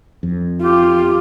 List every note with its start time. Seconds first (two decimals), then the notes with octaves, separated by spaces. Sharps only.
0.23 F2
0.62 F4 G4